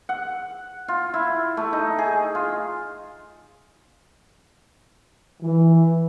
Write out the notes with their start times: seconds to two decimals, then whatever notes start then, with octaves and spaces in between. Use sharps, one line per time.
0.09 F#5
0.88 F4
1.14 E4
1.57 A3
1.73 D#4
1.98 G#4
2.35 F4
5.41 E3